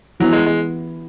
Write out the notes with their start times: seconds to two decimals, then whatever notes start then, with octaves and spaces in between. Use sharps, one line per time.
0.20 E3 F#3 B3 E4
0.33 G#3
0.46 G#3